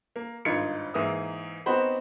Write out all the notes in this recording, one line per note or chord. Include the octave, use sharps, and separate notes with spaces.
A#3
G#1 G2 D#4 F4 G#6 C#7
G#2 E3 A#3 E5 D#6
B3 C4 D#4 F#4 C5 B5